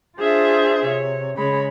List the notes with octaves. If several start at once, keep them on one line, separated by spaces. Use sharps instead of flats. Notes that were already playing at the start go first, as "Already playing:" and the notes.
D4 F4 G#4 C5 E5
C3 C#5
C#3 G#3 C#5 B5